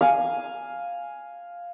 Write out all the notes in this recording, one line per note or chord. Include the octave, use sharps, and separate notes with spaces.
F5 G#5